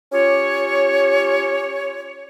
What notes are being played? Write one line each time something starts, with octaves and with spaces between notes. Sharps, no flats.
C#4 F4 G4 C#5